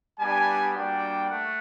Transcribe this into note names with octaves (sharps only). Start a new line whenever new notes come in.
G3 B3 D4 G4 G#5
G3 A#3 D4 F#4 G5
A3 F#5